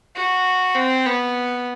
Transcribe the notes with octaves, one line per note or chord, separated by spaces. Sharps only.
F#4
C4
B3